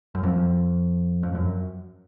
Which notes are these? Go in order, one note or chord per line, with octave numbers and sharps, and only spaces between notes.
F#2
F2
F2
F#2